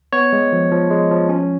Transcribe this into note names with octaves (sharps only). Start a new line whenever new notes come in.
B3 C#5
G#3
F3
F3
G#3
F3
C#4